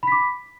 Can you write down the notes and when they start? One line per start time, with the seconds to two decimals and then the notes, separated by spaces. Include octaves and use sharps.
0.03 B5
0.07 B6
0.12 D6